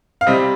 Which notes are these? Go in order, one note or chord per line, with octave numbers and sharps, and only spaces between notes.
F5
C3 G3 C4 D#5